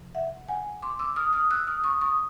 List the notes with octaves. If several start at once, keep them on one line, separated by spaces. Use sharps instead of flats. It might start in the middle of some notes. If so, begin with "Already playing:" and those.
Already playing: E2 C3 F3
E5 F#5
F#5 G#5
C6 D6
D6 E6
D#6 F6
D#6 F6
E6 F#6
D#6 F6
C#6 D#6
C#6 D#6